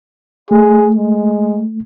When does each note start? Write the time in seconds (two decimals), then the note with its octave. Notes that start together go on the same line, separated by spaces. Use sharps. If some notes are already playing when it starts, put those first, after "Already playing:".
0.51 A3 G#4
0.96 G#3